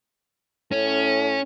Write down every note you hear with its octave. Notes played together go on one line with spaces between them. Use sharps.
A2 C#4